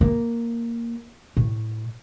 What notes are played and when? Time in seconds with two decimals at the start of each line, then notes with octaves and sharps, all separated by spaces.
0.01 A#3
1.37 A2